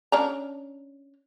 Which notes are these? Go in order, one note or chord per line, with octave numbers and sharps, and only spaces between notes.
C#4 D4 A#5